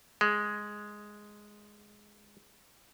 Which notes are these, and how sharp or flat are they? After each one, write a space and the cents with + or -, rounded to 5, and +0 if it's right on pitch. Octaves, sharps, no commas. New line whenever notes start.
G#3 +0